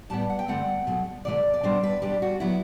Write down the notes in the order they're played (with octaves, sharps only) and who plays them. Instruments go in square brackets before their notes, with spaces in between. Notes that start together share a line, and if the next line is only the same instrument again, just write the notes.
[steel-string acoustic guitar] A2 G3 B3 A5
F#5
G5
G2 D3 A3 C4 F#5
B2 F#3 A3
E2 C3 E3 A3 D5
D5
E2 B2 G3 B3 D4 C5
B4
E2 B2 G3 D4 G4
F#4
F#3 B3 E4